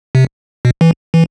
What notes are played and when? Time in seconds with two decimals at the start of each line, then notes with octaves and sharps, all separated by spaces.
0.15 C3
0.65 B2
0.81 E3
1.14 E3